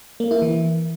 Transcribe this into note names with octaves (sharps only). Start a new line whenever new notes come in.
A#3
E4
E3